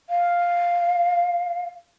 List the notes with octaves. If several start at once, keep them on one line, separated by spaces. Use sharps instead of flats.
F5